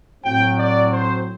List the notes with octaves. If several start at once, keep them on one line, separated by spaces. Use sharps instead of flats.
A2 F#3 C4 G5
D5
C5